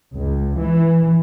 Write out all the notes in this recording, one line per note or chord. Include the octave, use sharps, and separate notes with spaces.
C#2
E3